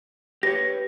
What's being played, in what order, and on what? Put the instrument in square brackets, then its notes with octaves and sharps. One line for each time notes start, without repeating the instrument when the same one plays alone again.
[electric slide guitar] G4 B4 C#5 [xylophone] A#6